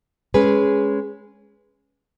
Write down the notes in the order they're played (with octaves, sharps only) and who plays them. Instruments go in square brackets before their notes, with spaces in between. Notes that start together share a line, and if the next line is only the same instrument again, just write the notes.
[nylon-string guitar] G#3 C#4 G#4 B4